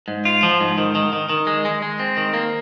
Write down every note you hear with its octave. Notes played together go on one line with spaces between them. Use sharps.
G#2
F4
F3
G#2
D#3
D#3
D#3
D#3
G#3
G#3
G#3
C4
D#3
A#3